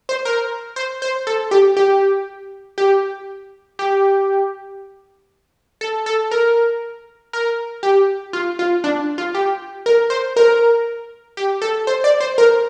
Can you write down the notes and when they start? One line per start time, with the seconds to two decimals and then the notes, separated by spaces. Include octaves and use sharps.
0.09 C5
0.25 A#4
0.76 C5
1.02 C5
1.27 A4
1.51 G4
1.77 G4
2.78 G4
3.79 G4
5.81 A4
6.06 A4
6.31 A#4
7.33 A#4
7.83 G4
8.33 F4
8.59 F4
8.84 D4
9.18 F4
9.35 G4
9.86 A#4
10.10 C5
10.36 A#4
11.37 G4
11.62 A4
11.87 C5
12.04 D5
12.20 C5
12.38 A#4